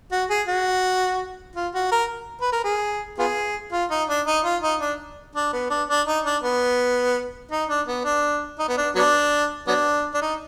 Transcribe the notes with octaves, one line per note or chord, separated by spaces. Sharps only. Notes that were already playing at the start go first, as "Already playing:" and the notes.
F#4
G#4
F#4
F4
F#4
A#4
B4
A#4
G#4
B3 F4 G#4
F4
D#4
D4
D#4
F4
D#4
D4
D4
B3
D4
D4
D#4
D4
B3
D#4
D4
B3
D4
D#4
B3
D4
F#3 B3 D4
F#3 B3 D4
D4
D#4